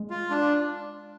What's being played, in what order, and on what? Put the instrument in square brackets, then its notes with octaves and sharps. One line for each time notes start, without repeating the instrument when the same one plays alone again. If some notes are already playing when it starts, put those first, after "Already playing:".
Already playing: [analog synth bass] G#3
[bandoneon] F4
D4